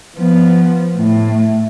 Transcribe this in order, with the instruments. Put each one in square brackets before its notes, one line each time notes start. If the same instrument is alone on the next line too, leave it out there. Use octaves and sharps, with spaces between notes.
[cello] F3 B3
A2